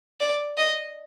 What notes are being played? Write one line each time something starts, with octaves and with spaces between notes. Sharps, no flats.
D5
D#5